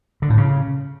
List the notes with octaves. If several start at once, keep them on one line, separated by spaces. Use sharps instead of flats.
D3
A2
C#3